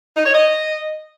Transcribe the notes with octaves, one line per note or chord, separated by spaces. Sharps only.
D#4
C#5
D#5